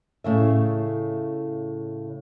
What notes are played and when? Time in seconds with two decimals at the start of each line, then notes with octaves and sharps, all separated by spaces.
0.24 A2 C#3 E5